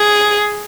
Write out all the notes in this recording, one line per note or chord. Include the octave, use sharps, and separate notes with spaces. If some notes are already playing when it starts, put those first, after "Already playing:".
Already playing: G#4